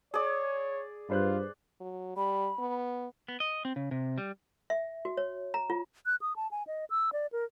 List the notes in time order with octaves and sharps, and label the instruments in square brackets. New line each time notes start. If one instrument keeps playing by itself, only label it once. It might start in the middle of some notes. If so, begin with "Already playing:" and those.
[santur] G#4 D5 [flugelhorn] C#5
[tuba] G2 [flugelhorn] F4 [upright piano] B4 C5 F#6
[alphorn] F#3
[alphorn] G3 [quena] B5
[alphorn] B3
[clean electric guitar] B3
D#5
C4
C#3
C3
G3
[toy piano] E5
F#4
C#5
A#5
F4
[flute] F#6
D#6
A5
G#5
D#5
E6
D5
A#4